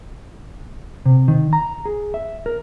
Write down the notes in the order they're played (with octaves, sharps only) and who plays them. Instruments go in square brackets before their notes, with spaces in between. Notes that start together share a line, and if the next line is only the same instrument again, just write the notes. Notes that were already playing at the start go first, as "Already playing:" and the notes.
[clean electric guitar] C3
D#3
A#5
G#4
E5
A#4